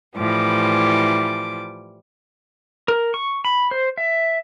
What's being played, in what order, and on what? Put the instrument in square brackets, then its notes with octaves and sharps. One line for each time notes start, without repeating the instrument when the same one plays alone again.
[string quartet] A2 E3 F3 G3 D6
[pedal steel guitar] A#4
C#6
B5
C5
E5